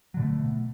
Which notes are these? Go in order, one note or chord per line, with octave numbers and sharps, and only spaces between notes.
B2 D3 F#3 A3